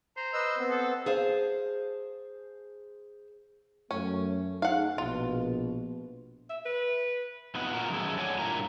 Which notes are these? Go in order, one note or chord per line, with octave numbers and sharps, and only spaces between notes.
C5 A#5
B4 D#5 E6
B3 C4
A4
G#4 C5 F5 A5
F#2 A3 C#4 A4
D#4 G#4 F5 F#5
A#1 B2 F4
E5
B4
F2 A3 B3 D#4 F#5
A#2 F#4 A#4
F#2 D#3 A3 G#4 A4
A4 C#5 D5 F#5 G#5
G2 A#2 A#3 E4 A#5